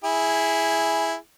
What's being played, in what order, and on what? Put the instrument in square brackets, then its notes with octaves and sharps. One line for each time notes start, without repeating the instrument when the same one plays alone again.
[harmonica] E4 G#4